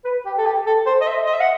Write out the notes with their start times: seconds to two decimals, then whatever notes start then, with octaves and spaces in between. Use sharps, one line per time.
0.04 B4
0.26 G4
0.38 A4
0.45 G4
0.66 A4
0.86 C5
1.01 D#5
1.07 E5
1.26 D#5
1.34 E5
1.40 F#5